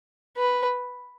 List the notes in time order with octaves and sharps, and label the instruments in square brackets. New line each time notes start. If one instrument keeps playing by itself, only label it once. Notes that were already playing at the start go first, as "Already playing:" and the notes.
[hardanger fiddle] B4